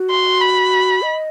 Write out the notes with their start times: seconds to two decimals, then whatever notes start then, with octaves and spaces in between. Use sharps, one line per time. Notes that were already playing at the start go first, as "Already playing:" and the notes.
Already playing: F#4
0.10 C6
0.41 B5
1.02 D#5